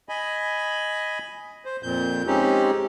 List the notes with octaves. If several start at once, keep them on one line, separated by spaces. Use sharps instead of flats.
D#5 G#5 B5
C5
F2 A#2 G6
G#3 C4 C#4 D#4 G4